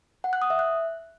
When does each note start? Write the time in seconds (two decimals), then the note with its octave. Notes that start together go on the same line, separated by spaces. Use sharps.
0.24 F#5
0.33 F#6
0.42 D#6
0.50 E5
0.59 F#6